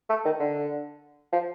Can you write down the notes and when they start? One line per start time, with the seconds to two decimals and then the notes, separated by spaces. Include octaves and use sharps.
0.10 A3
0.25 D#3
0.39 D3
1.32 F3